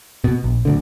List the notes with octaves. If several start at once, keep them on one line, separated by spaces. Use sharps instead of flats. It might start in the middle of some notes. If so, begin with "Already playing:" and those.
B2
A#1
D1 D2 D3